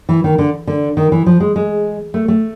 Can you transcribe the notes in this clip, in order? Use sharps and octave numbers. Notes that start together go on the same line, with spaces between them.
E3
D#3
D3
D3
D#3
E3
F3
G#3
G#3
A3
A3